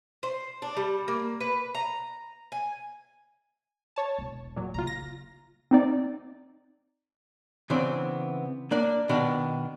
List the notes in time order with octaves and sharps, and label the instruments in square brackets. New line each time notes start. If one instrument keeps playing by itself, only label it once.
[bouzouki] C5
D4
G3
A#3
B4
A#5
G#5
[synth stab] C#5 A5
[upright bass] E1
[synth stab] A#2 F#3
[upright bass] C#3 A#3 [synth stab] F4 A#5
[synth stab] A#6
[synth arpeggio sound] C4 D#4 D5
[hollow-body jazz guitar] C#3 E3 B3 C4 D4
A#3 D4 D5
B2 D#3 D4 D#4